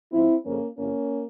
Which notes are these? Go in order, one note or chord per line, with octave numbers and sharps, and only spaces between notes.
G#2 F3 C4 E4
F2 C#3 F3 A#3 C#4
E2 C3 E3 A#3 C#4